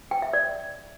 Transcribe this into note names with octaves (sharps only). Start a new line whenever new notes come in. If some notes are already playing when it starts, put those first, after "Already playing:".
G5
E5
D5